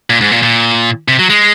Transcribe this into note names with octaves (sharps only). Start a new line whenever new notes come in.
A#2
G#2
A#2
A#2
C3
F#3
G#3